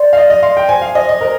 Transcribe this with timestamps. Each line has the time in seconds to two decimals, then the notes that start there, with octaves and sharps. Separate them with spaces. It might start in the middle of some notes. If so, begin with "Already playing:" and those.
Already playing: C5 D5 C6
0.13 F5
0.17 D5 D#5
0.30 D#5
0.43 F5 C6
0.57 G5
0.69 C5 G#5
0.82 F5
0.95 C5 D#5
1.09 D#5
1.21 A#4 C5